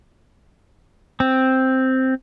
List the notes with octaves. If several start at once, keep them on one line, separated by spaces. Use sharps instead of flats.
C4